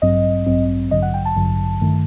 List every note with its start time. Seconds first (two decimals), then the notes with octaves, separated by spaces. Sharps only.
0.02 A1 G2 F#3 C4 D#5
0.47 A1 G2 F#3 C4
0.91 A1 G2 D3 F#3 D#5
1.02 F#5
1.14 G5
1.25 A5
1.36 A1 G2 D3 F#3
1.82 G2 D#3 A3